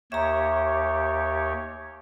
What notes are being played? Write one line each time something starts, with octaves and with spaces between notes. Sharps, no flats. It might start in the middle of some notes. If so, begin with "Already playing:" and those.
D#2 G4 C#5 E5 A#5